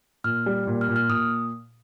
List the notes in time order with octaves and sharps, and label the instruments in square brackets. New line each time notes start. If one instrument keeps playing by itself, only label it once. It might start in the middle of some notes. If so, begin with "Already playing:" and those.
[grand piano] A#2 [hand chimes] F6
[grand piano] G3
A#2
[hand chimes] F6
[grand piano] A#2
[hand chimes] F6
[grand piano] A#2 [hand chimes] D#6